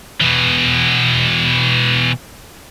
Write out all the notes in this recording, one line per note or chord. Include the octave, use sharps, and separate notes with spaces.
B2 E3